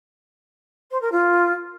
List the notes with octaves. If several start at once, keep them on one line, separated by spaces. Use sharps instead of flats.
C5
A#4
F4